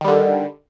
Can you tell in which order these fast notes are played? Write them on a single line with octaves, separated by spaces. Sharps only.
D#3 G3 D3